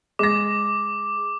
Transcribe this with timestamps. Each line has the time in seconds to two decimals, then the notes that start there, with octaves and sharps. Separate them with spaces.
0.19 G#3 D6 A#6